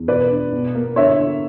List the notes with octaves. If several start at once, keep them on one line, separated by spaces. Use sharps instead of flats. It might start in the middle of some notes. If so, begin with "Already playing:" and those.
Already playing: E2
B2 B4 D5
D4
B2
A#3
D3 C#5 E5
D3